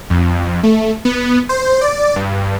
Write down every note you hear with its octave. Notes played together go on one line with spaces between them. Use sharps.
F2
A3
B3
C5
D5
G2